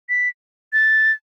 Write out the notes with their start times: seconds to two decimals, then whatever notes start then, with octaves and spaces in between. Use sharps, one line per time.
0.09 B6
0.73 A6